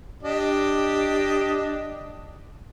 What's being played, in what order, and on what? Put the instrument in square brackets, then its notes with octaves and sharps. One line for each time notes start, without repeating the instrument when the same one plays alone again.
[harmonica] D4 G4 D#5